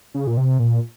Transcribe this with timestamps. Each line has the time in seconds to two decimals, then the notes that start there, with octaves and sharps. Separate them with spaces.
0.14 C#3
0.27 A#2
0.37 C3
0.59 A#2